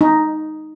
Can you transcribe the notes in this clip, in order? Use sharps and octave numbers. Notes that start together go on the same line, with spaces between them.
D#4